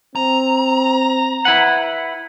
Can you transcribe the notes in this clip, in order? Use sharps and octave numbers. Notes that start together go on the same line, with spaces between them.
C4 A#5
E4 B4 F#5